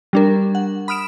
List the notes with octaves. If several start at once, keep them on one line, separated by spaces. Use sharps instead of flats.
G3 D4 A#4
F#5
B5 D#6 F6 D7 E7